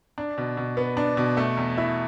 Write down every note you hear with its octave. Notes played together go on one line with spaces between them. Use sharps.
D4
B2
B2
B3
D4
B2
A3
E2
E4